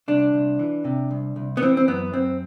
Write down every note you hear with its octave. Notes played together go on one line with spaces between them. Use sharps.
C2 D4
C2
E3
C3
C2
C2
B3
E3 C4
C4
F#2 B3
F#2 C4